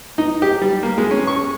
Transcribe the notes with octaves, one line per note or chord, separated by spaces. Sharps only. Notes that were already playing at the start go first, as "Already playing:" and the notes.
D#4
G4
G3
A#3
G#3
C#4
C#6